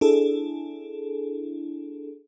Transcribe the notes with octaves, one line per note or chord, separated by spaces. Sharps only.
D4 E4 G#4 A4